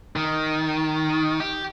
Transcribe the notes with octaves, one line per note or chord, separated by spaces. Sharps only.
D#3
G4